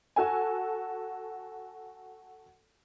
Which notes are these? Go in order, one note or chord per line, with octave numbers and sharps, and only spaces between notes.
F#4 A4 G#5